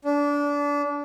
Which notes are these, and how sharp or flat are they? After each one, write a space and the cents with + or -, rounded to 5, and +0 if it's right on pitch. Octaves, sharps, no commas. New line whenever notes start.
D4 -25